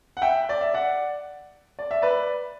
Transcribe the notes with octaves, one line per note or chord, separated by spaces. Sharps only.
F#5
E5 G5
D5
E5
D5 F#5
D5
E5
B4 D5